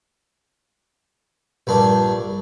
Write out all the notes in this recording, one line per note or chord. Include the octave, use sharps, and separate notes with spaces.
A#1 G2 D4